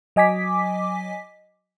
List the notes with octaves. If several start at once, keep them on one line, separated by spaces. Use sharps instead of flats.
F#3 D#5 G#5 D6 B6